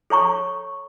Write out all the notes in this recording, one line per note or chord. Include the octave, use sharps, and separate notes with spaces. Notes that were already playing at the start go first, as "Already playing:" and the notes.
A4 C#5 A#5 C#6